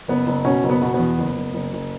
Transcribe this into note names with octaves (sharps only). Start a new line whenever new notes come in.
F#1 B3
F#1
B2 C#4
F#1
B3
B2
E2 B3
F#1
F#1
F#1
F#1